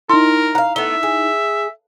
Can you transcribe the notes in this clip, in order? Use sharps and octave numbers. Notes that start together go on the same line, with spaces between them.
D#4 E4 A#4 C6
F5 F#5 A#5
A3 B3 E5 G7
G#4